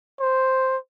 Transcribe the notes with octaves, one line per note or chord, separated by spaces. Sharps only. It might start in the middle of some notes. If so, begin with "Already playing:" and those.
C5